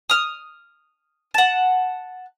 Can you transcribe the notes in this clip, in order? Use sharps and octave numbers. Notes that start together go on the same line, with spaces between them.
D#6 F6
F#5 A5